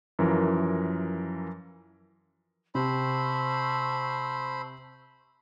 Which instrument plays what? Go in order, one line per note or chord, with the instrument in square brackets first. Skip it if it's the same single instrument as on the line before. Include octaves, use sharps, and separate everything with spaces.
[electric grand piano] F#2 E3 F3 A#4
[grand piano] C3 [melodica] C5 B5 [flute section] A5 C#6 E6